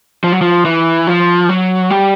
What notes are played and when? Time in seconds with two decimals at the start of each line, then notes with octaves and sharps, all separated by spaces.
0.24 F3
0.32 F#3
0.41 F3
0.65 E3
1.07 F3
1.49 F#3
1.90 G3